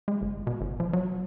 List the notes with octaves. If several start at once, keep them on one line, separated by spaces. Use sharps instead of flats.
G#3
G1
B2
G1
F3
F#3